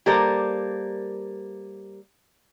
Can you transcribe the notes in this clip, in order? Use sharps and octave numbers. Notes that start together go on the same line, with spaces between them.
G3 A#3 A4 A#4 C5 D5